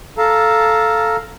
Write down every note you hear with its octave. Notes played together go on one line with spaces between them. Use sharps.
A4 F5 A5 A#5